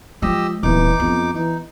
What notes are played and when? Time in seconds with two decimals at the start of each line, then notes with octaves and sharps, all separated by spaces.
0.22 F3 G#3 G4 D#5 E6
0.63 D#1 E3 B3 D#4 D6
1.00 F2 B3 C#4
1.35 E3 D#4